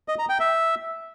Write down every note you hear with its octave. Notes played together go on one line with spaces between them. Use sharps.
D#5
A#5
G5
E5